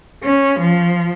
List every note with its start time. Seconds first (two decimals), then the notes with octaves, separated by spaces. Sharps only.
0.23 C#4
0.59 F3